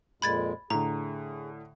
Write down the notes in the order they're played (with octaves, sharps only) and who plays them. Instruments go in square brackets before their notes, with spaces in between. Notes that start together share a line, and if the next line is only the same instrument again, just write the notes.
[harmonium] F2 A#2 G#3 [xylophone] B5 G#6 A6
[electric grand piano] A2 D3 [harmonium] G#4 [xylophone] A#5